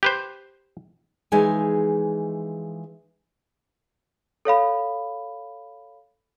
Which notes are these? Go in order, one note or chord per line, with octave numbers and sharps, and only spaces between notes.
G4 B4 C5
E3 F3 G#3 D#4 G#4 G#5
A4 C#5 F5 B5